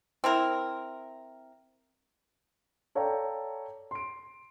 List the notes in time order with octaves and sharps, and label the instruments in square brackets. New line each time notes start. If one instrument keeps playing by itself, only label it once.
[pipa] C4 E4 A#4
[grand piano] A4 C#5 D5 F5 G5 A#5
C6 D7